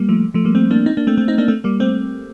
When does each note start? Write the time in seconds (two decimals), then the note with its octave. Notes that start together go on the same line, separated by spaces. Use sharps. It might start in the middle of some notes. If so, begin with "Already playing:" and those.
Already playing: G3 A#3
0.09 F3 A3
0.34 F3 A3
0.44 G3 A#3
0.55 A3 C4
0.71 A#3 D4
0.86 C4 D#4
0.97 A#3 D4
1.07 A3 C4
1.17 A3 C4
1.28 C4 D#4
1.38 A#3 D4
1.48 A3 C4
1.64 G3 A#3
1.80 A3 C4